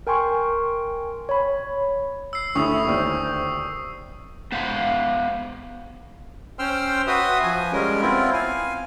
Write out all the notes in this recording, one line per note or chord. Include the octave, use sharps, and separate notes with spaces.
A#4 G5 G#5 C6 C#6
C#5 B5
E6 C7
D2 E4 A4 C#5 C#6 D#6 E6
D#2 C5 D5 F6
B3 C5 E5 F5
C#4 C5 G5 C6 E6 F6
F#4 B4 E5 C6 D#6
F3 G#5
G3 G#3 C#4 A#4
B3 C4 E4 F4
F5 G#5